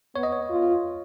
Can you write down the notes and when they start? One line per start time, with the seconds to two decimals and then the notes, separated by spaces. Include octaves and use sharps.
0.16 B3 C#5
0.23 D#5
0.33 C#5
0.50 F4